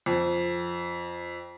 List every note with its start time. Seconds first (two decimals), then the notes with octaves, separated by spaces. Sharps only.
0.06 F2